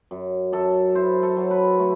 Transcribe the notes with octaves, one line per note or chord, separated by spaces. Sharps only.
F#2
F#2 A4
E4 C5
A4
F#3
B4
A3